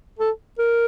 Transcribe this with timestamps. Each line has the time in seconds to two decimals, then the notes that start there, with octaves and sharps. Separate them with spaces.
0.19 A4
0.58 A#4